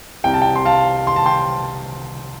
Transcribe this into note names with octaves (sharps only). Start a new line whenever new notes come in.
C2 C3 G3 G5
A5
G5
C6
F5 A5
C6
A5
G5 C6